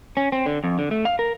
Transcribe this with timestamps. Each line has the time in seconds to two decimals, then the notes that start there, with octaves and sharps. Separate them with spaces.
0.17 C#4
0.32 C4
0.46 D3
0.64 F2
0.79 D3
0.91 A3
1.05 F5
1.19 A#4